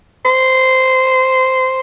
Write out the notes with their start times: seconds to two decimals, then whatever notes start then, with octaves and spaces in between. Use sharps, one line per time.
0.25 C5